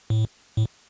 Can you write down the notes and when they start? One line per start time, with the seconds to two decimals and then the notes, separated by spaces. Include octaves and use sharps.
0.10 A2
0.57 A2